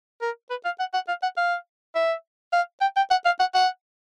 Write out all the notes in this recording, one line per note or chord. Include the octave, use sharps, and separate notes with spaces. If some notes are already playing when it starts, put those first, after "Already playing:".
A#4
B4
F5
F#5
F#5
F5
F#5
F5
E5
F5
G5
G5
F#5
F5
F#5
F#5